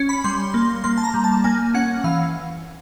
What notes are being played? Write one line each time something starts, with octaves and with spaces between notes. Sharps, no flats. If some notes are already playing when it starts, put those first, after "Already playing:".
Already playing: C#4
B5
G3 C6
A#3
A#3 C6
A5
A#5
G3
A5
A#3 G#5
C#4 F#5
E3 F5